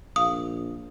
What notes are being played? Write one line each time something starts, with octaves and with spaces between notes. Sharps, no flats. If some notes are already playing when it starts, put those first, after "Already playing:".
A#1 F5 D#6